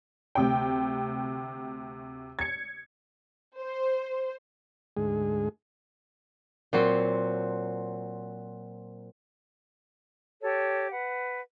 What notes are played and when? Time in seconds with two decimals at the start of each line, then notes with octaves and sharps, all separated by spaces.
0.35 D2 C3 G5
2.39 G#6 C#7
3.59 C5
4.97 D2 G#2 G#3 G#4
6.73 A#2 F#3 C4
10.42 G4 A4 C#5
10.91 B4 F#5